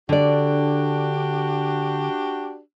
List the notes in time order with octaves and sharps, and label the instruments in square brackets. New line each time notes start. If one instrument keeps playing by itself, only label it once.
[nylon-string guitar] D3 D5 [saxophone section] D4 F#4 G4